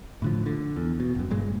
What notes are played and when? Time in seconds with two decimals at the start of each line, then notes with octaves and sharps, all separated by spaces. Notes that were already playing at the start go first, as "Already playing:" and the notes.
0.22 A2 D3 F3
0.46 D3
0.76 E2
1.00 B2
1.15 F#1 F#2
1.30 G#1 G2 A#2 G#3